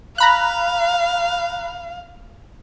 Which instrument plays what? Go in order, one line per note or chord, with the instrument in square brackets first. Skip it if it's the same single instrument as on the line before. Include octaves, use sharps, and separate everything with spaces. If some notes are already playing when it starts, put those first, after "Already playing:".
[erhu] F5 [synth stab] A#5 B5 F#6